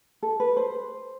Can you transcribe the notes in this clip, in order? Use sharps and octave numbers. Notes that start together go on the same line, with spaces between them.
A4
B4
C5